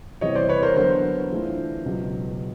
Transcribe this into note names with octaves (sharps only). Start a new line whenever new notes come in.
E2 C3 E3 G3 C4 C#5 D#5
C5 D5
B4 C#5
A#4 C5
D3 F#3 B3 A#4 C5
E3 A3 D4 F4
C#2 B2 F#3